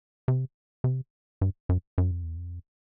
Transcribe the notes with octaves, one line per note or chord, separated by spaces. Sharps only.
C3
C3
G2
F#2
F#2
F2
E2
F2